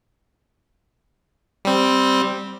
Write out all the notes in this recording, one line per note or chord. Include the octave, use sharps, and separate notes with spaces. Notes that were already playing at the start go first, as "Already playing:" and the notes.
G3 C4